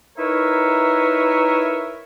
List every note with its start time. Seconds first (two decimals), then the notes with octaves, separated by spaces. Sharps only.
0.18 D#4 E4 A#4 B4 C#5 E5